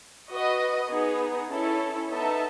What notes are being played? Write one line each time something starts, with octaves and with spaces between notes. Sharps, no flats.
F#4 B4 D#5
B3 D#4 G#4
C#4 E4 A4
B3 D#4 A4 E5 A5